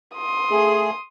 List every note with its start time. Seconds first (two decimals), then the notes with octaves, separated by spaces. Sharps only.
0.16 C6 D#6
0.51 A3 G#4